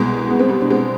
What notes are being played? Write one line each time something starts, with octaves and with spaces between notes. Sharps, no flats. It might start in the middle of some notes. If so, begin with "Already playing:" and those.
Already playing: C2 B2 G#3
B3
C4
G3 B3
D4
G#3 C4